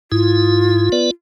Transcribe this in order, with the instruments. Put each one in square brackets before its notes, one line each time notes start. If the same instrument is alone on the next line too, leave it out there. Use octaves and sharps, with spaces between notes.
[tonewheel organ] G#2 E4 [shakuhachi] F4
[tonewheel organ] B3 B4 D5